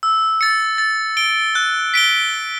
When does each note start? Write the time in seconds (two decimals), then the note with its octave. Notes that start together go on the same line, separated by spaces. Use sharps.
0.03 E6
0.41 A6 C#7
0.78 A6
1.17 D7 G7
1.55 F#6
1.94 B6 D7 G7